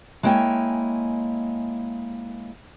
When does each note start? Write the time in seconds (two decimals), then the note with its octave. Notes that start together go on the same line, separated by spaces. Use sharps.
0.23 G#3 A#3 E4 C#5 G5 G#5